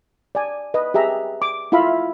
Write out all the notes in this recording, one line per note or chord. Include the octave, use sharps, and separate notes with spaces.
D5 G#5
B4 D#5
G4 G#4 E5 A#5
D6
E4 F4 E5 F5 B5